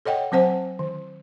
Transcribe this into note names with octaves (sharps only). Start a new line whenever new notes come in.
A4 C#5 D#5 F#5 G5
F#3 C4 C5 F#5 G#5
D#3